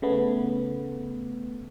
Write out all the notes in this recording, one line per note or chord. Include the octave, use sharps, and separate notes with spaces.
C#3 A3 B3